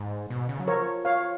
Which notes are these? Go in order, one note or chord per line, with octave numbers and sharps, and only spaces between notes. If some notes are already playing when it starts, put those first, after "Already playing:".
Already playing: G#2
B2
C#3
F#3
F3 A#4 C#5
C#5 F5